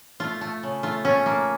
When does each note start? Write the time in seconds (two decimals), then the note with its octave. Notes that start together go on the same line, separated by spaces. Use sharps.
0.20 A3 F4
0.41 A3
0.63 C#3
0.83 A3 F4
1.05 A3 C#4
1.26 A3 A#3